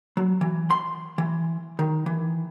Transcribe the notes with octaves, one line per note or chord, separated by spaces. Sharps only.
F#3
E3
C6
E3
D#3
E3